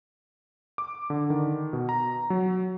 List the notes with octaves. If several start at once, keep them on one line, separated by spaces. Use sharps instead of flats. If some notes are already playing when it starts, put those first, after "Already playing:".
D6
D3
D#3
B2
A#5
F#3